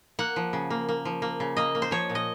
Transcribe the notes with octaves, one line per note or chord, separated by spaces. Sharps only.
A#3 F#5
F3
C#3
A#3
A#3
F3
A#3
C#3
A#3 D#5
A#3
C5
F3 C#5
A#2
D#5